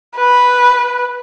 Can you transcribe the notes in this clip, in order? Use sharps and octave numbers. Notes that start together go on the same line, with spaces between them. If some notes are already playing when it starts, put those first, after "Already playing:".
B4